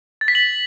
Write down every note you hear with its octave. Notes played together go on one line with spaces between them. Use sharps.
A6
B6
F#7